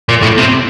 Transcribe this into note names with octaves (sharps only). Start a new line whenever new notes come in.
A#2
A2
C3